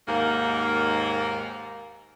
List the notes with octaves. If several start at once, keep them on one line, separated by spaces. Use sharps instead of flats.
D#2 G#2 A#3